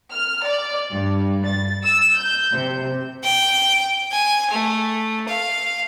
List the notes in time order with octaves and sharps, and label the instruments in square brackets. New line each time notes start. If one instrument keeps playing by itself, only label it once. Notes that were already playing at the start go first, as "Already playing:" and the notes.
[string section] F6
D5
G2
A6
E6
G6
C3
[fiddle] G5
G#5
A3
F5